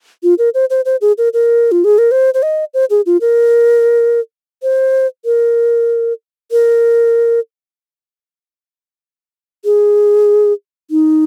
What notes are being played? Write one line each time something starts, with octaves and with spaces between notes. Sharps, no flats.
F4
A#4
C5
C5
C5
G#4
A#4
A#4
F4
G#4
A#4
C5
C5
D#5
C5
G#4
F4
A#4
C5
A#4
A#4
G#4
D#4